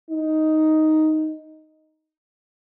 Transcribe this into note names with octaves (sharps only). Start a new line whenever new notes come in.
D#4